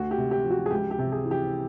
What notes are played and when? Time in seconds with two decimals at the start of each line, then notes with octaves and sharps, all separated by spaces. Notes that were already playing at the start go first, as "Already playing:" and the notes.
Already playing: D2 F#4
0.11 G4
0.18 C3
0.31 G4
0.44 F3
0.51 F#4
0.66 G#4
0.71 C#2 G4
0.91 G4
0.99 C3
1.12 G#4
1.25 E3
1.31 G4